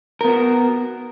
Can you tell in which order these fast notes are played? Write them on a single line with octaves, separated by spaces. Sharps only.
A#4 B3 F#4